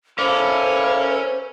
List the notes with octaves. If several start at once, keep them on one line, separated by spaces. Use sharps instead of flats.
C#4 E4 A4 A#4 C5 D5 F5